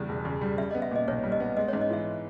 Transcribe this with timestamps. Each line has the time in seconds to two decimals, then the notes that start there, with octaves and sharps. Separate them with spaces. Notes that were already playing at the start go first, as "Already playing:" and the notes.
Already playing: E2 C#3 G3
0.09 E1
0.25 C#3
0.41 G3
0.58 G3 E5
0.71 B3 D#5
0.82 E5
0.91 A#2 D#5
1.08 B1 C#5
1.24 G3
1.32 D#5
1.40 B3
1.57 G#3 D#5
1.68 G#2 C#5
1.81 D#5
1.90 E3 E5